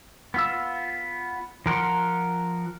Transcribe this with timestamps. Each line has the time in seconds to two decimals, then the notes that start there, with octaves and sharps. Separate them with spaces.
0.34 B3 F4 E6
1.66 F3 A#4 F#5 C6